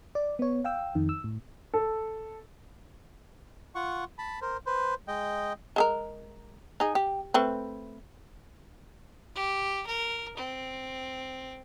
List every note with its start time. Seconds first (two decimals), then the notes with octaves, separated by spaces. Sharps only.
0.15 D5
0.39 B3 C#5
0.64 F5 G5 E6
0.95 F2 D#3
1.09 E6
1.24 A2
1.74 A4
3.75 F4 F#5 C#6
4.18 A5 B5
4.42 A#4 C5
4.66 B4 C5
5.08 G#3 D#5 G5
5.76 G#3 A4 A#4
6.80 D#4 G#4
6.95 G4
7.34 A3 C4 B4
9.36 G4
9.87 A#4
10.37 C4